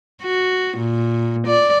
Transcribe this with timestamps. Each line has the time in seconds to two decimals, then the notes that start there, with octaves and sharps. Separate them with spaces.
0.22 F#4
0.78 A#2
1.48 D5